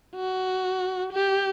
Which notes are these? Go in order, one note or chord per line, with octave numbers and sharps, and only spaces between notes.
F#4
G4